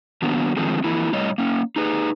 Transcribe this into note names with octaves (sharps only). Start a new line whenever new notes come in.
D#3 F#3 A#3 B3 D4
D3 D#3 F3 G#3 A3 C4
E3 F3 A#3 E4
A2 G3 C#5 D#5
A#3 C#4
D#4 G#4 B4